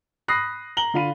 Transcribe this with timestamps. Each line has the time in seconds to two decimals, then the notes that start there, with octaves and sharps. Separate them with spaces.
0.28 B5 D#6 F#6 A#6 C7
0.77 A#5 F#7 G7
0.94 D3 F4 F5 B5 D#7